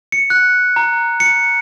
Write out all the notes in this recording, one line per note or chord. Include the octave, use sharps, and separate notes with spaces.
C#7
F#6
A#5
C#7